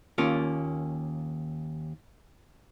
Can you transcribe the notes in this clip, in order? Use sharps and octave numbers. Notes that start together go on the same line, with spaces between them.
D#2 A#3 C#4 F4